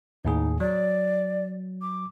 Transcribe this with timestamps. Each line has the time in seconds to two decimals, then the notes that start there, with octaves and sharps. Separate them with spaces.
0.25 D#2 A2 D#4 G#4
0.60 F#3 D5
1.82 D6